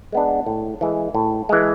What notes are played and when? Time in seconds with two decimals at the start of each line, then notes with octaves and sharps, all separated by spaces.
0.12 G#3 B3 D4
0.46 A2
0.81 E3 G#3
1.15 A2
1.49 E3 G#3